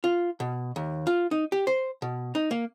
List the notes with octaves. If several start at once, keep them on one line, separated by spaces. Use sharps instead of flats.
F4
B2
D#2
F4
D#4
G4
C5
B2
D#4
A#3